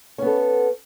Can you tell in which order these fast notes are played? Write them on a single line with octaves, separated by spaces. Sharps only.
C#4 B3 A4